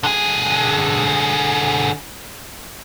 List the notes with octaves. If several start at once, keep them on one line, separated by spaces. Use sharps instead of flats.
D3 G#4